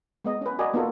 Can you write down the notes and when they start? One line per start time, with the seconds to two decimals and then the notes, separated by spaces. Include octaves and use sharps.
0.25 G#3 B3 D#5
0.41 C#4 B4
0.59 F#4 A#4 D5 D#5 G#5
0.73 A#3 B3 D#4 F4 F#4 A4